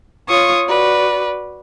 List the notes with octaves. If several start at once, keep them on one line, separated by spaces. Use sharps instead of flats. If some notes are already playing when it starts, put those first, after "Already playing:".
F4 C#5 C#6 D#6
F#4 B4 D5